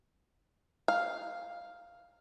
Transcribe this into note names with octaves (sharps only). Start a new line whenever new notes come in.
F5